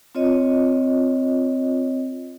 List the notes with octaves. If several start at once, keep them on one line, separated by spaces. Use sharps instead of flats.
C4 F4 C#5 D#5